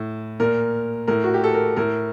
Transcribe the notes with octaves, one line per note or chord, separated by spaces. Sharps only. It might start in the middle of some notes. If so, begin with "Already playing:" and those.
Already playing: A2
A#2 A#4
A2 A#4
F#4
G4
A4
A#4
A2 A#4